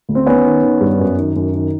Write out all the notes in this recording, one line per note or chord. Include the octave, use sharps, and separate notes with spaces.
D2
C4
D#3 B3 C#4
D#3
D#3
G2
F#2
D#3
F#2
D#3